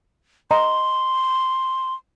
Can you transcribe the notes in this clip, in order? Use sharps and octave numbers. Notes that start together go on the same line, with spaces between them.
D#5 A#5 C6